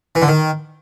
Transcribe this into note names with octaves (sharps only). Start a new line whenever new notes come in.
E3
D3
D#3